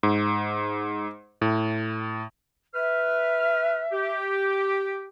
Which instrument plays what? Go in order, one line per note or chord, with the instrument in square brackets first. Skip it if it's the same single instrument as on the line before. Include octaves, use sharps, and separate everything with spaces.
[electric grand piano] G#2
A2
[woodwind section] B4 F6 [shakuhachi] E5
[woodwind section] G4